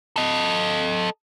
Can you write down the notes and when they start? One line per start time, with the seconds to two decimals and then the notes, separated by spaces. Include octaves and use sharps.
0.16 A4 D#5